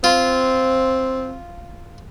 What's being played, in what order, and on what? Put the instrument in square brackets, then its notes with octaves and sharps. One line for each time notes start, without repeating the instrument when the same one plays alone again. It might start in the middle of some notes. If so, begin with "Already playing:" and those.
[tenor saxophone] C4 [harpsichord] F4